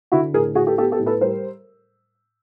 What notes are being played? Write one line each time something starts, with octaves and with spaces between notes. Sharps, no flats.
D3 E4 F#4
A2 G#4 A#4
A2 F#4 G#4
G4 A4
B3 G4 A4
G4 A4
A2
A4 B4
G3 A#4 C5